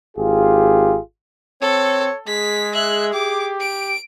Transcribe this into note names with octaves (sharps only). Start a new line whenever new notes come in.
G#1 F4 G4 G#4
C4 A4 C#5
G#3 G#4 B6
E5 F#6
G4 D6
D7